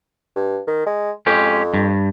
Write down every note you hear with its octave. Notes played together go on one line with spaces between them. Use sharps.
G2
D#3
G#3
F2 G#3 C#4 G4
G2